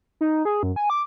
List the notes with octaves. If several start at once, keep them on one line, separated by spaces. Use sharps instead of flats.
D#4
G#4
F#2
G#5
D6